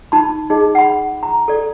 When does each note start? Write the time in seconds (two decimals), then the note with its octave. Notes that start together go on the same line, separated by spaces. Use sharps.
0.12 D#4 A5 B5
0.50 D#4 G#4 D#5
0.75 F#5 B5
1.23 A#5
1.48 A4 D5